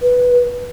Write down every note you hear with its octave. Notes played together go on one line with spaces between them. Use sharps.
B4